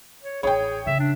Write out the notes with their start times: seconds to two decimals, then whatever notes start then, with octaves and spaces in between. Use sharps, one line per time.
0.23 C#5
0.43 A1 G#4 C#5 G5
0.86 C#3 E5
1.00 D4